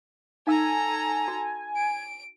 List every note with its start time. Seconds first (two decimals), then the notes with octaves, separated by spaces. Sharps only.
0.47 D#4 A4 F5 G#5 A#5 E6
1.28 F#4
1.76 D7